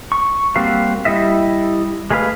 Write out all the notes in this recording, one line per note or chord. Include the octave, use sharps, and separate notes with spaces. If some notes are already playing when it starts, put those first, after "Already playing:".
C#6
G3 A#3 C4 F#4 F5
G3 E4 D#5 E5
G#3 A3 G#4 B4 F5